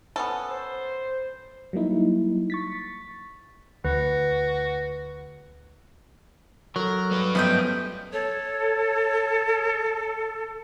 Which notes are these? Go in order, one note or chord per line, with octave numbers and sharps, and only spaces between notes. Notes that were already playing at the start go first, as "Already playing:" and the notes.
B3 C#4 A4
C5
F#3 G3 A#3 D#4 E4
C#6 A6 B6
D2 F#4 B4
F#3 A4 A#4
G3 B4
F#2 F3 A3 B3 C#4 D#5 G5
A4 C#5